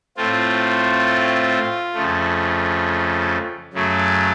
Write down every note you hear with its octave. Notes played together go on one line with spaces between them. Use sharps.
A2 A3 C4 F4
F2 C#3 F3 A3
F#2 C#3 F#3 A3